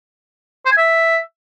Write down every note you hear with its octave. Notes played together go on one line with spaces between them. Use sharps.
C5
G#5
E5